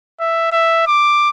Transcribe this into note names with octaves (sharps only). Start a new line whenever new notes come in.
E5
E5
D6